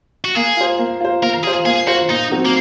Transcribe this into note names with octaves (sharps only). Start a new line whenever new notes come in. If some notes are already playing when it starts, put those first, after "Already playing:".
F#4
A#3 G#4
F4 C5
A#3
F4 C5
A#3 A#4
F4 G#4 C5
A#3 G#4
F4 F#4 C5
A#2 D#4
F#3 C4 D#4 F#4
A#3